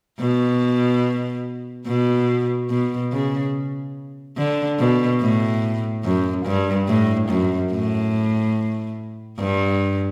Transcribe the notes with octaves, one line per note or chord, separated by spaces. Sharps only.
B2
B2
B2
C#3
D3
B2
A2
F#2
G2
A2
F#2
A2
G2